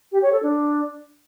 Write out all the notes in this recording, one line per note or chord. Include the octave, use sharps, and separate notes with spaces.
G4
C#5
A4
D4